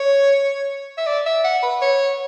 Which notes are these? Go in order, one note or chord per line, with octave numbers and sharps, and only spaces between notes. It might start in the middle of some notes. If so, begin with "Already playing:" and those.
Already playing: C#5
E5
D5
E5
F#5
B4
C#5